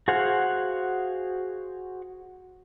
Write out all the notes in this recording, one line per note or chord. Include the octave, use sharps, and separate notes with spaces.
F#4 G#4 C5 F5 F#5